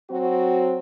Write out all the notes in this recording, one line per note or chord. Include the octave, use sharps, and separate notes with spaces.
F#3 C4 F#4